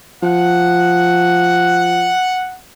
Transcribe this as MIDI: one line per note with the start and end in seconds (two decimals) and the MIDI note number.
0.23 2.13 53
0.23 2.58 78